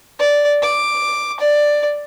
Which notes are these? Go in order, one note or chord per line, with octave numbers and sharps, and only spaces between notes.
D5
D6
D5